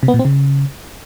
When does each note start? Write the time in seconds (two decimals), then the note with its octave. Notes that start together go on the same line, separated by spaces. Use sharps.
0.03 C3
0.08 B3
0.14 A#2
0.19 C4
0.25 C#3